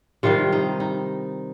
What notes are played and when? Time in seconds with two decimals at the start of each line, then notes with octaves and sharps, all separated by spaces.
0.23 C3 D#3 G3 F4
0.52 D#4
0.80 D#4